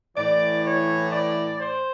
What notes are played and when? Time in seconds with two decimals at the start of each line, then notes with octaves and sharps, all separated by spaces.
0.16 A2 E3 D5
0.64 C#5
1.12 D5
1.60 C5